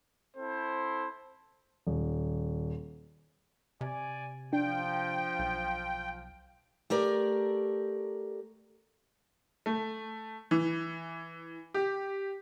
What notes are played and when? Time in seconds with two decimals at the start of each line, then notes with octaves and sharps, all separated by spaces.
0.36 C4 E4 A4 C5
1.87 D#1
3.81 C3 D5 G#5
4.53 F3 D4 G5
5.39 B1
6.90 A3 G4 A#4 D5
9.66 A3
10.51 E3
11.74 G4